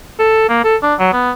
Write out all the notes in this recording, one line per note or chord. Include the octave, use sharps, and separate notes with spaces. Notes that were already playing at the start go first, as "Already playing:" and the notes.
A4
A#3
A4
D4
F#3
B3